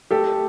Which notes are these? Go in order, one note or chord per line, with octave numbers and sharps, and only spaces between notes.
A3 G4 A4